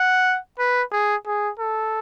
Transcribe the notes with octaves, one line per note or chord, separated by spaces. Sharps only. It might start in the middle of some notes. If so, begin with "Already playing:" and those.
Already playing: F#5
B4
G#4
G#4
A4